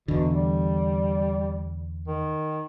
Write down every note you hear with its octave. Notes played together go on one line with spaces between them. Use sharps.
E2 B2 D3
G3
D#3